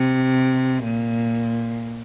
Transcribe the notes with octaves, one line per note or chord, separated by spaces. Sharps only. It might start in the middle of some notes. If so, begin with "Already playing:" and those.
Already playing: C3
A#2